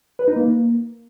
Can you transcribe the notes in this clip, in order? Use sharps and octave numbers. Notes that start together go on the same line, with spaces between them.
B4
D#4
A#3